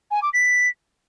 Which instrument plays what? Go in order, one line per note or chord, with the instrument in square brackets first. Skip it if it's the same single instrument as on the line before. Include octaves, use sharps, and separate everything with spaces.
[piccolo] G#5
D6
B6